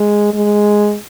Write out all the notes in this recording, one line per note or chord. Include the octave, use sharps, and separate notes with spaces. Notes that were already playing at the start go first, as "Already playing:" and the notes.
Already playing: G#3
G#3